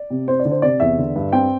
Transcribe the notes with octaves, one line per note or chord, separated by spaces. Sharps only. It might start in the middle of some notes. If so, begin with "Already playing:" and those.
Already playing: D5
C3
C4 C5
D5
D3
C5
C3 D5
E2 E5
D3
G2
C4 G5